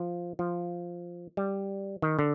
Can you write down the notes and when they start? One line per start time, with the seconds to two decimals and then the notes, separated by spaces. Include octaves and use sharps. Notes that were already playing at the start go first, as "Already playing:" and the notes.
Already playing: F3
0.39 F3
1.37 G3
2.02 D#3
2.19 D3